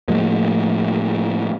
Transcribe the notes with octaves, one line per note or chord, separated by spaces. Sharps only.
A2 F3 G#3 A#3